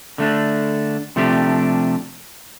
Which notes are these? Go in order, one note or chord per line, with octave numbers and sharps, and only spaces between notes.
D3 A3 D4
C3 F3 A3 D4 G4